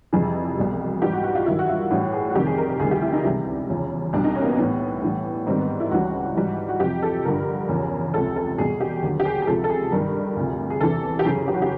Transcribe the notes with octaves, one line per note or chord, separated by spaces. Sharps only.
F2 C3 E3 G3 G#4
C2 B2 G3
G#2 E3 G3 G4
F#4
F#4
F4
G2 D#3 F#3 E4
F#4
F4
A2 E3 G3 F#4
G#4
F#4
F2 C3 D#3 G3 G4
G#4
A#4
A#4
D2 C3 D#3 G3 G#4
G4
E4
D#4
C#2 C3 E3 G3
E2 C#3 F3
C2 B2 G3 D4
D#4
C#4
A#3
B3
A2 E3 G3 B3
A2 E3 G3
G#2 D#3 G3 C4
B3
E4
C#2 C#3 E3 G3 F#4
G#2 E3 G3
F#4
F2 C3 F3 G4
A4
G2 D3 F3 A#4
E2 C#3 F3
C#2 C3 F3 A4
A4
E2 B2 G3 G#4
G4
D#2 D3 F#3
G4
G#4
G#4
C#2 C3 F3 A4
A4
G#4
G2 D#3 G3 A#4
D2 C3 F3
G#4
E2 C3 E3 A4
G4
F#2 C#3 E3 G#4
G4
F#4
G4